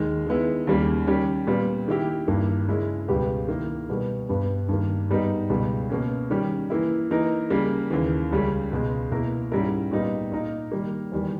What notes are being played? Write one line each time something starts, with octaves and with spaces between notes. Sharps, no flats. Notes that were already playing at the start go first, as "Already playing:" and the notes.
Already playing: D#2 D#3 G#3
D#3 G#3 B3 E4
D#2 C#3 G3 A#3
D#3 G3 C#4 G4
A#2 G3 B3
D#3 A#3 E4 G4
G2 D#3 A#3 E4
C#3 G#3 C#4 E4
C#2 B2 G3 B3 G4
D#3 A#3 E4
B2 G3 B3
G2 G3 B3
G2 D#3 A#3
G#2 G3 B3 D#4 A#4
C#2 B2 G3
B2 A#3 C#4
D#3 G3 C#4 G4
E3 A#3 E4
E3 A#3 D#4 A#4
C#3 G3 A#3
D#2 C#3 E3 A#3
C#2 C#3 G3 C#4
C#2 B2 G#3
B2 A#3 E4 A#4
G#2 G3 C#4 E4 A#4
A#2 G3 B3 D#4
A#2 A#3 D#4 A#4
D#3 G3 A#3
E2 D#3 G3